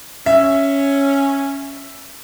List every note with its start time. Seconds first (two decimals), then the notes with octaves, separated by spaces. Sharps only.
0.26 C#4 E5